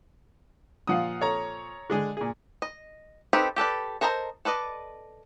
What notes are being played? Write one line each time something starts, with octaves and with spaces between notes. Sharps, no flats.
A#2 F3 F5 F#5 D#6
A4 C#5 A#5
D3 G#3 G#4
A#2 G#4
D#5
C4 D#4 G4 A4 B4
G4 A4 B4 D5
A4 A#4 C5 D#5 A#5
A4 B4 D5 D#5